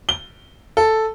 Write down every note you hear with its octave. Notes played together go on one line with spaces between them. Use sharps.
G7
A4